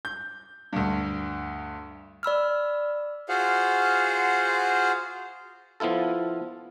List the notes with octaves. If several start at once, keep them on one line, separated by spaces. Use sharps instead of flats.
G6
D2 G2
D5 B5 E6 F6
F4 F#4 G#4 C5 F5 F#5
F3 B3 E4 F4 A4